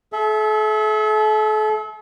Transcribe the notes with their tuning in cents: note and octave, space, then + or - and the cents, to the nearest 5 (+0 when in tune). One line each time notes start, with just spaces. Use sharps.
A4 -40 E5 +0